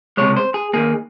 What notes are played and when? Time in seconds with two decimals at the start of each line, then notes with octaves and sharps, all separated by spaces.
0.17 C#2 C3 F3 G#3 C#5
0.36 C5
0.54 G#4
0.73 D#2 D#3 A#3 G#4